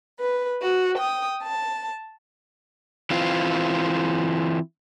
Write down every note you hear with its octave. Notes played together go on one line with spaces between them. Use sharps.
B4
F#4
G5 D#6
A5
E3 C4 F4